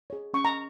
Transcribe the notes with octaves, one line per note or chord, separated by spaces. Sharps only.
G#4 C#5
C#4 C#6
A#5